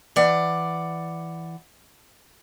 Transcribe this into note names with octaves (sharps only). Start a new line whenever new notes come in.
E3 D5 F#5